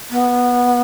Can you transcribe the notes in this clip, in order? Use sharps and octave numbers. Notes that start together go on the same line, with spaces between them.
B3